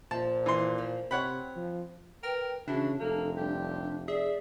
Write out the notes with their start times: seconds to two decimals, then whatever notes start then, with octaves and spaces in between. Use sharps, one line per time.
0.11 A#2 F3 A5
0.46 E3 C6
0.78 F3
1.11 C3 C4 C#5 F#5 B5
1.56 F3
2.23 A#4 B4 G5
2.68 C#3 E3 D4 F#4
3.00 F1 A#3 A4
3.37 G3 G4
4.08 G#4 D5 E5